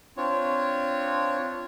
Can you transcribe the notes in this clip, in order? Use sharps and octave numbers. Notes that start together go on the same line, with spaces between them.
C4 D4 F4 C#5